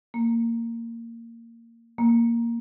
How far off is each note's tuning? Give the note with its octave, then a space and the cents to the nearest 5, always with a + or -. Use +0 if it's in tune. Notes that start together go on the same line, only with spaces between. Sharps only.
A#3 -15
A#3 +0